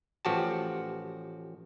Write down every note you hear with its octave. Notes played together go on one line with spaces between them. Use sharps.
A1 F3 F#4 G4 A5